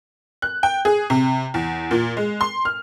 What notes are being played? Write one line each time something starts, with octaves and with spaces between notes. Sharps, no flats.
F#6
G5
G#4
C3
E2
A#2
G#3
C6
F6